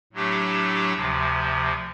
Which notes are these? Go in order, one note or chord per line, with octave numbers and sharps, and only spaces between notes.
A2 F#3 A3 D4 G4
D2 C3 F3